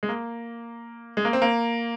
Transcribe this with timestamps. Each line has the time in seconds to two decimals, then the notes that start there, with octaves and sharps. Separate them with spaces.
0.03 G#3
0.09 A#3
1.17 G#3
1.25 A#3
1.33 C4
1.42 A#3